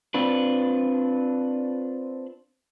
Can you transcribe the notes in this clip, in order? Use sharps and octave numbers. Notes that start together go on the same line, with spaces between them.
C4 D4 F4 B4